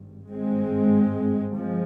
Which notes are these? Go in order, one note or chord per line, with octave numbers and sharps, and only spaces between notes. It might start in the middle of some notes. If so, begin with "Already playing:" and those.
Already playing: G#1 G2
G#1 G2 G#3 C4
G1 F3 G#3